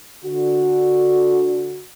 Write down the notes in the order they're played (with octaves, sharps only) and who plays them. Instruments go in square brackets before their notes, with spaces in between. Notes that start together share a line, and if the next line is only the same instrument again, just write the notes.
[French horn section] D3 F#4